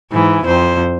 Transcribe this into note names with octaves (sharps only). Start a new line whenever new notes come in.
G#2 E3
F2 C5